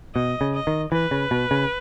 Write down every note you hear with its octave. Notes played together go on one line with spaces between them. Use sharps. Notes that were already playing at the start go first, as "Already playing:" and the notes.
B2 D#5
C#3
D#5
D#3
E3 B4
C#3
B2
C#3